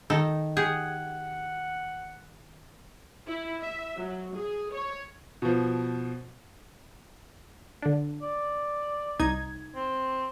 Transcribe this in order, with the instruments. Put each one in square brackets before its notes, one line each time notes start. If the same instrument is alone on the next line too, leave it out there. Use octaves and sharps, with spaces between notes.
[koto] D#3 D#4 A4
[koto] G4 G#4 [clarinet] F#5
[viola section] E4
E5
F#3
G#4
C#5
[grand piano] B2 F3
[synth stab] D3 D4
[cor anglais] D5
[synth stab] C2 D#4 G#6
[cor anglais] C4